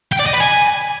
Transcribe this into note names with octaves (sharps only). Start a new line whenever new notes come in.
G5
D5
D#5
B4
G#5